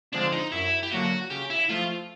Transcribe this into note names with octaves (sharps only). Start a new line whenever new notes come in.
D3 F3 G#3 C4 D4
D#4
F#2 E4
G4
D3 F#3 A#3 F#4
C#3 G4
E4
F3 A3 F4